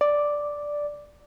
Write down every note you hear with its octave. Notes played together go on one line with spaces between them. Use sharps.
D5